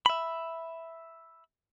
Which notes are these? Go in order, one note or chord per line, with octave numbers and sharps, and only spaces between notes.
E5 B5